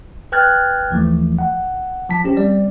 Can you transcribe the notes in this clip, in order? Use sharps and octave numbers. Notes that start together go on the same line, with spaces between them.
B4 G5 F6 F#6 G#6 A6
D#2 E3 F3 A3
F#5
F3 A5 B6
C#4 G4 C5
G3 C4 D5